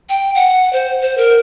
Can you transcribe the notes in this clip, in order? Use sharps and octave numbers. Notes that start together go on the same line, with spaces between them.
G5
F#5
C5
C5
A#4